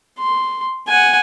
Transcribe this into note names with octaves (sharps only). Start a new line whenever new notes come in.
C6
F#5 G#5